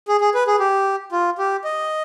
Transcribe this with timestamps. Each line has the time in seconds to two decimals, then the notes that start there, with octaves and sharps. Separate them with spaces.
0.08 G#4
0.21 G#4
0.35 B4
0.47 G#4
0.60 G4
1.12 F4
1.38 G4
1.64 D#5